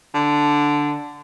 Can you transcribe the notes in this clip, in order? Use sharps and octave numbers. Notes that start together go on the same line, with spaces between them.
D3